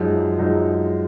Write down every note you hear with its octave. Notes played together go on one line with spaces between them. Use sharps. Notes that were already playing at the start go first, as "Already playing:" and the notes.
Already playing: F#2 F3 G#3 D#4
F#2 F3 G#3 D#4